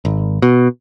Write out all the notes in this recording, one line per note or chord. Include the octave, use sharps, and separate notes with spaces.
G#1
B2